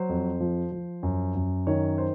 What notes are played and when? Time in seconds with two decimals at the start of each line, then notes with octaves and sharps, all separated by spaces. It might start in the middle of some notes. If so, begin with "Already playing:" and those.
Already playing: F#3 C5
0.09 F2
0.40 F3
0.72 F3
1.03 F#2
1.35 F#2
1.67 D#3 C#5
1.98 C5